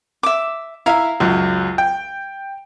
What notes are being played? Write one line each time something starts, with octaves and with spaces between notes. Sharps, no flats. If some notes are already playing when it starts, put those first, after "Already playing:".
E5 D6
E4 E5 F5 A#5
C#2 F#2 F#3
G5